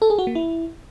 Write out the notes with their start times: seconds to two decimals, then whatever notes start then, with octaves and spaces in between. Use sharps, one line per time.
0.02 A4
0.10 G#4
0.19 F#4
0.27 A#3
0.35 E4